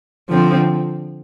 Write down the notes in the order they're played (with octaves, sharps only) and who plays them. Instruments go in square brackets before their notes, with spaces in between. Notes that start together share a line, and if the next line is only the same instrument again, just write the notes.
[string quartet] D3 F3 C4